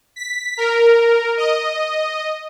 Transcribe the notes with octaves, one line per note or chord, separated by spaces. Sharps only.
B6
A#4
D#5